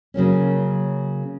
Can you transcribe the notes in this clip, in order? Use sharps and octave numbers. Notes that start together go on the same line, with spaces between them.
C#3 F#3 A#3 C#4